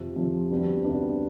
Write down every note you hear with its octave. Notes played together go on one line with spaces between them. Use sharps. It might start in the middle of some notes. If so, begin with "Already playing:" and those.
Already playing: F2 C3 F3
F2 C3 F3
D2 C3 G3 B3 D4
D2 C3 G3 B3 D4